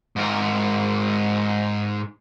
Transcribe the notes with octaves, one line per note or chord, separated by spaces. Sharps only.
G#2 A#4